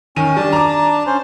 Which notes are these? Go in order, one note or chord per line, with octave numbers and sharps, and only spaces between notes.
D#3 C#4 D#7
G3 D4 A5
A#5 D6
C#4 C5